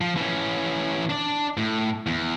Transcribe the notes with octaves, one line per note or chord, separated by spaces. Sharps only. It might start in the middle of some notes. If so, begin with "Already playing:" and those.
F3
E3 C#4
D4 D5
A2
E2